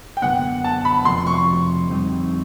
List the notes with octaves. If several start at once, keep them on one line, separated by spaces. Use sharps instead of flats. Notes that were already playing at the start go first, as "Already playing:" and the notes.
G5
F#2 D3 F#3 B3 D4 F#5
A5
B5
F2 C3 F3 A3 C6
C#6
F2 D3 G3 C4 D#4